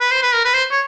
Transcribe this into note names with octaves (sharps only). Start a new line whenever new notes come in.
B4
C5
B4
A#4
B4
C5
C#5